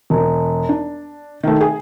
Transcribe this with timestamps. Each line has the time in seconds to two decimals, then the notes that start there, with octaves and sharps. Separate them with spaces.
0.10 E1
0.69 D4
1.43 D#3 A3
1.61 G#4